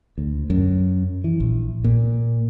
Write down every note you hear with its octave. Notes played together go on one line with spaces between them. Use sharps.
D2
F#2
E3
A#1
A#2